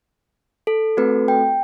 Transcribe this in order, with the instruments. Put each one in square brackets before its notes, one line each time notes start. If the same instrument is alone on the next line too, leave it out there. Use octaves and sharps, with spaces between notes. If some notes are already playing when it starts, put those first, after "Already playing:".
[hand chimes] A4
A3 C4 F#4 A4 B4
G5